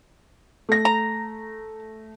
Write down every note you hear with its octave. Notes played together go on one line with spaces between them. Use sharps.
A3 A#6
A#5